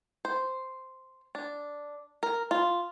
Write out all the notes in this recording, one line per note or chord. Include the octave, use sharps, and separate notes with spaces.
C5
D4
A#4
F4